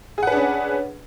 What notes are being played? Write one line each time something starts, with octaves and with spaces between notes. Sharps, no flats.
C#4 D4 G#4 B4 F#5